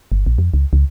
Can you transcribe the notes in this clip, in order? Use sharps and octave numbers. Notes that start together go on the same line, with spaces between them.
G1
A#1
F2
C#2
C#2